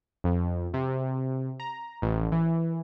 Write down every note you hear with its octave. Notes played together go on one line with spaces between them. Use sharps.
F2
C3
A#5
A1
E3